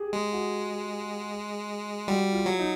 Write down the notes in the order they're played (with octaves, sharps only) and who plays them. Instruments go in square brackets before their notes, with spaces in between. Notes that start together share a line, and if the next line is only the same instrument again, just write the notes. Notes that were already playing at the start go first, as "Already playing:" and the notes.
Already playing: [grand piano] G4 G#4
[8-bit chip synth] G#3 [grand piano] G4
[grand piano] F#4
[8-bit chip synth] G3 [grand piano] F#4
[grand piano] F4
[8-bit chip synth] F#3
[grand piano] D#4